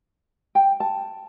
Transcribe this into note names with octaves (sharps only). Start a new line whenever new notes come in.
G5
A5